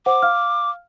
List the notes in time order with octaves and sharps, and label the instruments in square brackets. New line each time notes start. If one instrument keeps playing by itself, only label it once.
[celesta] C5 F#5 [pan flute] D6
[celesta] F5 F6